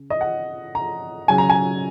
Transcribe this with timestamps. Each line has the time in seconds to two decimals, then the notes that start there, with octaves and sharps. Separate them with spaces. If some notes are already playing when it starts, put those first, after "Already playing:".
Already playing: C#3
0.10 D#5
0.21 F#5
0.75 A#5
1.28 C#3 F#3 G#5
1.38 A#5
1.50 G#5